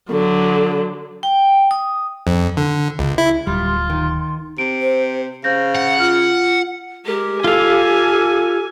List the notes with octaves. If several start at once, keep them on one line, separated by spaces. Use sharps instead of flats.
D3 F#3
G5
D#6
F2
D3
C#2
E4
D1 G3 F4 C6
D#3
C3 D7
C5
C#3 C5 F5 G6 A#6
F#5
F4 F6
G#3 G4 A#4
F4 A4 F5 G#5